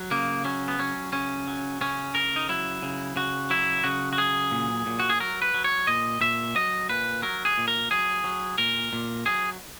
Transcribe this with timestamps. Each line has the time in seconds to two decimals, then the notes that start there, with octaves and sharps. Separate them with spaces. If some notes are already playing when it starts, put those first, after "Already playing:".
Already playing: F#3
0.11 C#3 A#3
0.45 F#3 C#4
0.68 B3
0.79 F#3 C#4
1.13 C#3 C#4
1.48 F#3
1.81 C#3 C#4
2.15 C#3 A#4
2.36 D#4
2.49 F#3 E4
2.83 C#3
3.16 C#3 F#4
3.50 F#3 E4
3.84 C#3 F#4
4.13 F#4
4.18 F#3 G#4
4.51 A#2
4.86 A#2
5.00 F#4
5.10 G#4
5.20 F#3 A#4
5.42 B4
5.54 F#3
5.64 C#5
5.87 A#2 D#5
6.21 A#2 E5
6.55 F#3 D#5
6.89 A#2 B4
7.22 F#3 A#4
7.45 G#4
7.58 A#2
7.68 A#4
7.91 F#3 G#4
8.24 F#3
8.58 A#2 A#4
8.93 A#2
9.26 F#3 G#4